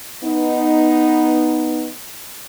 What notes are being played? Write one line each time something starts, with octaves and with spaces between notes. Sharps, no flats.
B3 D#4